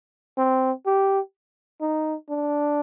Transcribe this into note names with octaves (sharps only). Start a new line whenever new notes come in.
C4
G4
D#4
D4